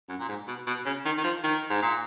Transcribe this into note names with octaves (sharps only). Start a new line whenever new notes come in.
F#2
A#2
G#2
B2
B2
C#3
D#3
D#3
F3
D#3
G#2
A#2